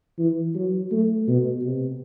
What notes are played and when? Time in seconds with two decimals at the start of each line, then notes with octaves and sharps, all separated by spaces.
0.19 E3
0.55 F#3
0.92 A3
1.28 B2
1.63 C3